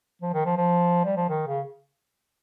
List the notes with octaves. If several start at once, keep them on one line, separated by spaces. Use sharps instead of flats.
F3
D#3
F3
F3
G3
F3
D#3
C#3